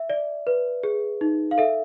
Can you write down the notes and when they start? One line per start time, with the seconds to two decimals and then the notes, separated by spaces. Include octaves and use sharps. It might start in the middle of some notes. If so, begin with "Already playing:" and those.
Already playing: E5
0.10 D5
0.47 B4
0.83 G#4
1.21 D#4
1.51 F5
1.58 A4 E5